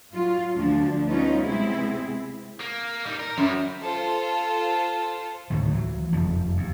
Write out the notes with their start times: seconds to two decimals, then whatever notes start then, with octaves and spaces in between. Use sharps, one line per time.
0.13 F#3 F4
0.54 D2 F3 D4
1.08 G3 A3 B3 C#4 D#4 F4
1.42 C3 G#3 B3 C4 E4 G#4
2.60 A#3
3.06 G3 D#4
3.20 A#4
3.38 F#2 G3 E4
3.81 F4 A4 C5
5.50 D2 A2 D#3
5.71 E3 F#3
6.13 F#1 F2 C3 F3
6.57 D#2